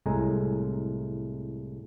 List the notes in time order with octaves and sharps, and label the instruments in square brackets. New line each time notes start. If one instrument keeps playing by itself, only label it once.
[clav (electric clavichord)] C2 A2 G#3 G#5 A#5